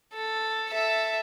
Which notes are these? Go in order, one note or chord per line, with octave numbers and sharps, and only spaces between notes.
A4
A4 E5